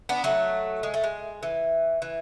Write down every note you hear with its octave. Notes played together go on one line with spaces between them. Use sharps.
B3 D4
F#3 A3
G#3
A3
G#3
E3
E3